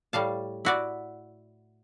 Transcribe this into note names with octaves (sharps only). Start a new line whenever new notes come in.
A2 G3 F5 A5
E4 F#4 D5